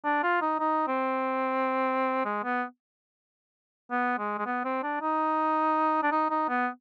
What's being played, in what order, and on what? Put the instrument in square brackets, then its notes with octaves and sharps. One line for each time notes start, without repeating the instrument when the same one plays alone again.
[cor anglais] D4
F4
D#4
D#4
C4
G#3
B3
B3
G#3
G#3
B3
C4
D4
D#4
D4
D#4
D#4
B3